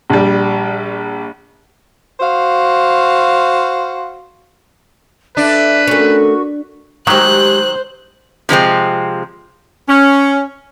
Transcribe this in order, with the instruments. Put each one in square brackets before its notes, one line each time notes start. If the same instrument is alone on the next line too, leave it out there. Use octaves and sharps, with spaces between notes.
[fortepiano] A#1 G3
[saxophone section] F#4 C5 F5
[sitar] D4 [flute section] A4 E5 [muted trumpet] B4
[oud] A3 C#4 [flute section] F#4 A#4 C#6
[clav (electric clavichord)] D#3 F#3 [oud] G#3 G4 [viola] C5 [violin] F#6
[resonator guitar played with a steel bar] C3 F3 G#3 C4
[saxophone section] C#4